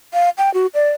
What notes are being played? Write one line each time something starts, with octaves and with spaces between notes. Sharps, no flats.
F5
G5
F#4
D5